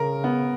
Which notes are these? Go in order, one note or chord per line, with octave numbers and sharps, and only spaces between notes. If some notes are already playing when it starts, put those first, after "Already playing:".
Already playing: C#3 A#4
B3